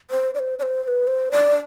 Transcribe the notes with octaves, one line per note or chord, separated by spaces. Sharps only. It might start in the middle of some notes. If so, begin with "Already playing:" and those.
C5
D5
C5
D5
C5
C5
B4
C5
D5